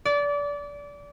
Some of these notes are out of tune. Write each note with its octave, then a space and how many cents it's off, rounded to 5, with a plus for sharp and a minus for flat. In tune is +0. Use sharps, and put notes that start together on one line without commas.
D5 -25